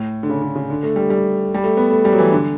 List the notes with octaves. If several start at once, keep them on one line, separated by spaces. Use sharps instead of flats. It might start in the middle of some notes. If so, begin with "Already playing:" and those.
Already playing: A2
D3
C#3
D3
C#3
D3
A3
G3
G3
G3
A3
B3
A3
G3
F#3
E3
D3